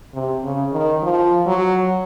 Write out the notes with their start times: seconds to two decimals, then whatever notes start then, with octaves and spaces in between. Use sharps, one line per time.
0.14 C3
0.43 C#3
0.72 D#3
1.02 F3
1.47 F#3